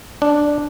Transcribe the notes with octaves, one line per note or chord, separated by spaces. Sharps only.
D4